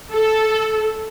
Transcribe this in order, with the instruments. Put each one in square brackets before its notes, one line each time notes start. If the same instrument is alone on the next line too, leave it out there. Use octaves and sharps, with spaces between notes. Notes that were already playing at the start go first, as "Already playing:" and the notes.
[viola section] A4